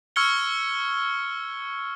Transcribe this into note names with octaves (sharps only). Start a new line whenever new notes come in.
C#6 E6 F6 G#6 C#7 G7